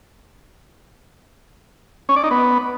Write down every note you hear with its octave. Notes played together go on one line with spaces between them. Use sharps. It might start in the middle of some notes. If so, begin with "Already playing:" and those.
C#4
D5
D#4
B3